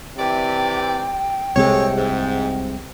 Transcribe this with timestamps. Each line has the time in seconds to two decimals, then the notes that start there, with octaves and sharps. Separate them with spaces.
0.17 C3 E3 D5 G5
1.56 C2 C3 G#3 G#4 A4 C#5
1.95 G#2